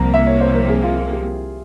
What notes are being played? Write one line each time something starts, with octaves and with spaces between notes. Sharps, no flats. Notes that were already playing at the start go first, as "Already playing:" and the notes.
Already playing: C2 C3 F3 A#3 A#5
E5
C#5
C5
A#4
G#4
F4
F4
G4